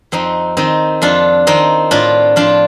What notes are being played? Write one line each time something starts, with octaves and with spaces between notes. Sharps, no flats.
F2 C4 D#4
D#3 C4 D#4
F2 D4 F4
D#3 C4 D#4
A2 D4 F4
F3 D4 F4